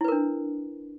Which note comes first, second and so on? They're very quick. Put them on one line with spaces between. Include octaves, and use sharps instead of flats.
E4 B4 A#4 D4